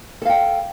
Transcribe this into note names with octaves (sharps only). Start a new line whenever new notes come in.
A4 F5 G5